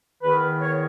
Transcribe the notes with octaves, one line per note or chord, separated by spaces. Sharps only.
E2 D#3 B4
C#5